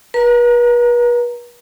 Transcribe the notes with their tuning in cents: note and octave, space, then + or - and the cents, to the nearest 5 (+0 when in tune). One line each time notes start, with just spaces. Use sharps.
B4 -40 A#5 +0